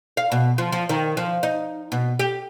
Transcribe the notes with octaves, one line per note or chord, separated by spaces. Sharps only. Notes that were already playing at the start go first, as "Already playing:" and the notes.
F5
B2
F3
F3
D#3
F3
D#4
B2
G4